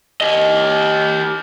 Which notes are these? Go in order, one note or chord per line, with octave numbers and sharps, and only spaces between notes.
G4 D#5